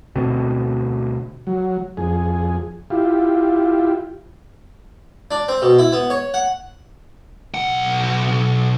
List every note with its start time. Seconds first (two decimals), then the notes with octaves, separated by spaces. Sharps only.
0.16 D2 B2 C4
1.47 F#3
1.97 F2 G#4
2.90 E4 F4 G4
5.31 D4
5.48 C4
5.62 B2
5.79 E4
5.92 B3
6.10 C#5
6.34 F#5
7.54 B1 F#5